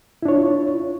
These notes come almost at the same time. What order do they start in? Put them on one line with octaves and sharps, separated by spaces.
E4 D4 C#5 F4